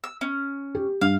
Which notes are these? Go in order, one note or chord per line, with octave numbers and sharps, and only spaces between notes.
E6
C#4
G4
G2 F5